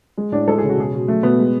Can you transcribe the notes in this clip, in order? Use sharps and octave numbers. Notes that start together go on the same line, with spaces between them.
G#3
A2 D4
G#3 A4
C#3 G#4
F#4
B2 G#4
B2
F#3 A3
B2 B3
G#3